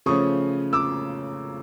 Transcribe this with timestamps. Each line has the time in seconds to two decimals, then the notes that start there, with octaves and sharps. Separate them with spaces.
0.06 C#3 F3 A3 C#4 C#6 D#6
0.73 D6 E6